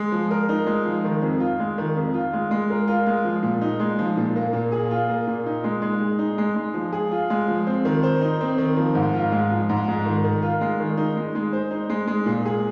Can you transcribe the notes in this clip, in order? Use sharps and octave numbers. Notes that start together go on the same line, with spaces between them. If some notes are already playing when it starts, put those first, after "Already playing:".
Already playing: G#3
F3
A#4
D#4
G#3
F3
D#3
F2
F4
G#3
D#3
F2
F4
G#3
G#3
A#4
F4
G#3
F3
A#2
D#4
G#3
F3
A#2
A#3
A#2
G#4
F4
A#3
A#2
D#4
G#3
G#3
G#4
D#4
G#3
G#3
F3
G#4
F4
G#3
F3
C4
D#3
C5
D#4
C4
D#3
F3
G#2
F4
G#3
F3
G#2
G#3
D#3
D#3
F4
G#3
D#3
D#4
G#3
G#3
C5
D#4
G#3
G#3
A#2
G#4